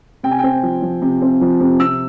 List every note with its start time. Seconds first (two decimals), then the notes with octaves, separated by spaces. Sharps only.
0.23 C3 G5
0.31 G#5
0.39 C4 G5
0.63 F3
0.82 F3
1.02 C3
1.22 C4
1.41 F3
1.60 C3
1.80 C3 E6